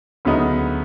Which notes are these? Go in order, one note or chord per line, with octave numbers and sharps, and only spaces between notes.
D2 C#3 F#3 B3 D#4